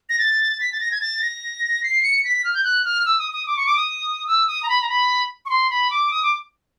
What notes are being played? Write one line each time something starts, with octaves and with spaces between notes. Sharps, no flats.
A#6
A6
B6
A6
A#6
G#6
A6
A#6
C7
C#7
B6
F6
G6
F#6
F6
E6
D#6
D#6
D6
C#6
D6
D#6
E6
D#6
A#5
B5
A#5
B5
C#6
C6
B5
D6
D#6
D6